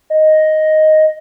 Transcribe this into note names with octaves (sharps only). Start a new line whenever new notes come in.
D#5